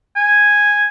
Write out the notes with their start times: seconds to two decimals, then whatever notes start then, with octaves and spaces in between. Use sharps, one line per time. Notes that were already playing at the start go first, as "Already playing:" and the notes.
0.17 G#5